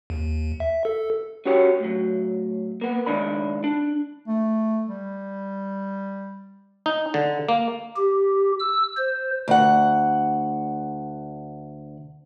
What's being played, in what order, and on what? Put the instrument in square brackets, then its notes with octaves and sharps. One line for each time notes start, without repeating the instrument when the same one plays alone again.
[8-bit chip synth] D#2
E5
A4
[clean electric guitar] C#4 F#4 G4 C#5
A2 F#3
A#3 B3
C#2 G#2 D#3 D4 B5
D4
[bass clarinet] A3
G3
[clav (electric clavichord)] D#4
D3
A#3
[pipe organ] G4
E6
C5
[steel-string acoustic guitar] D2 F#5